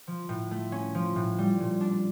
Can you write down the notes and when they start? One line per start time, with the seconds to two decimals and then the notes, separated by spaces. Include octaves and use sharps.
0.08 F3
0.29 A2
0.51 A3
0.72 C#4
0.95 F3
1.16 A2
1.38 G3
1.60 A#2
1.81 D4